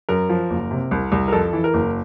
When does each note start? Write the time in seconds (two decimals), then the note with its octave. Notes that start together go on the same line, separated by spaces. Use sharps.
0.09 F#2 A#4
0.29 F3
0.50 F#1
0.71 C3
0.91 C2
1.12 C2
1.28 A#4
1.32 F2 A4
1.53 E3
1.64 A#4
1.74 F#1